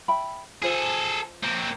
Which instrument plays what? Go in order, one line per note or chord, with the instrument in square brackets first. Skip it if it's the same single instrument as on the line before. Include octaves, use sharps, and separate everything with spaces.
[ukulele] E5 G5 B5
[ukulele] F4 C5 [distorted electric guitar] G#4 A4
[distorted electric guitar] A#3 C4